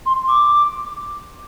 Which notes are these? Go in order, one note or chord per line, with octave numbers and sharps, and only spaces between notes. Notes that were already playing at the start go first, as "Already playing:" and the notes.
C6
D6